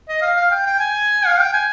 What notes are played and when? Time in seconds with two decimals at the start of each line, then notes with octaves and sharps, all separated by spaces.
0.08 D#5
0.22 F5
0.37 F5
0.51 G5
0.66 G5
0.79 G#5
1.26 F5
1.39 G5
1.53 G#5